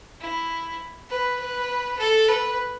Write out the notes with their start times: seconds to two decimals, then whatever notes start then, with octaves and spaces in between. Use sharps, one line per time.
0.20 E4
1.09 B4
1.40 B4
1.99 A4
2.28 B4